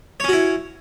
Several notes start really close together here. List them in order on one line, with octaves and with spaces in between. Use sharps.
C#5 C#4 F#4 E4